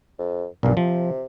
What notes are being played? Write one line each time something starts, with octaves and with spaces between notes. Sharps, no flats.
F2
B1 G2 A#2
C3 F3